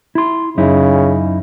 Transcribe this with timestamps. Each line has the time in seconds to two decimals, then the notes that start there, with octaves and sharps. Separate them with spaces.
0.15 E4 C6
0.58 F#2 C#3 D#4 E4